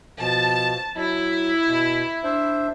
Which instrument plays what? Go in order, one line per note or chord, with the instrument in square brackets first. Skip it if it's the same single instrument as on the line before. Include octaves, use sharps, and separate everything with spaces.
[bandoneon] B2 F3 [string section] A5
[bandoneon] F#3 [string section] E4
[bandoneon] B2
D4 C5 E5